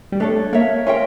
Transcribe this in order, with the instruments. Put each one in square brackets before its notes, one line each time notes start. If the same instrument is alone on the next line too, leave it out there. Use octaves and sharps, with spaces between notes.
[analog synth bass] G3
[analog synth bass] A3 [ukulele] D4 A4 C#5
[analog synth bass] A#3 [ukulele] A#4 C#5 E5
[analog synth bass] C#4 [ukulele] F4 A#4 E5 G5